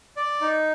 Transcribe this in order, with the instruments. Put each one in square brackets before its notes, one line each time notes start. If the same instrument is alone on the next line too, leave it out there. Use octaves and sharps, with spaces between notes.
[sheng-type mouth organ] D5
D#4